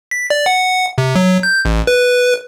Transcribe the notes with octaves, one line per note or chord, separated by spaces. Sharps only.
B6
D5
F#5
C3
F#3
G6
A1
B4